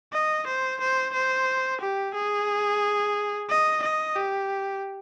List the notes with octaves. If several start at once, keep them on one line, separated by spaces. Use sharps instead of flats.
D#5
C5
C5
C5
G4
G#4
D#5
D#5
G4